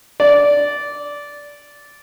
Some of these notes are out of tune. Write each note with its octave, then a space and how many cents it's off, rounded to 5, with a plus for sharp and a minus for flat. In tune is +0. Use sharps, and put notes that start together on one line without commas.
D5 -15